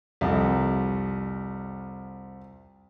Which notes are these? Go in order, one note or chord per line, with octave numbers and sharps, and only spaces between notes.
C2 F2